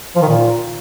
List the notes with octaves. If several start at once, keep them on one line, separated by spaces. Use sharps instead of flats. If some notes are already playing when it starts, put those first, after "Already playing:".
F3
D#3
A#2